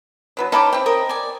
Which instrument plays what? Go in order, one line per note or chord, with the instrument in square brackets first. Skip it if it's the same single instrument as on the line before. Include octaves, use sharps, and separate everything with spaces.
[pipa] F#3 B3 D4
[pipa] C#4 A5 B5 [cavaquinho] D#4 G5 D6
[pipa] C4 G5 [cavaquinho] E4
[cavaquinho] A#4 D#5 D#6
D5 G#5